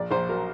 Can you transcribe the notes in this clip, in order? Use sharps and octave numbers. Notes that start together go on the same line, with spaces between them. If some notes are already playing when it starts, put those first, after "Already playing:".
Already playing: A#1 D5
A#1 C5
F#3 A#4